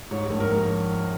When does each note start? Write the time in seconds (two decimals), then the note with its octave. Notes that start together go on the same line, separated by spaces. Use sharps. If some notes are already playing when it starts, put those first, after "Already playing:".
0.11 G#2 C#5
0.30 A#1
0.40 A#4